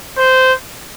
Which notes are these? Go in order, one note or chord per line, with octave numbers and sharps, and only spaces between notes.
C5